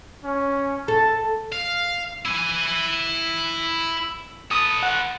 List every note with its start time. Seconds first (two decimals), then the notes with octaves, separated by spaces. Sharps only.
0.24 C#4
0.88 A4 A5
1.52 F5
2.25 E4 G#5
4.51 A4 B4 D#6
4.83 F#5